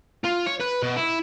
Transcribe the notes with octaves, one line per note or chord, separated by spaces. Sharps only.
F4
C#5
B4
B2
E4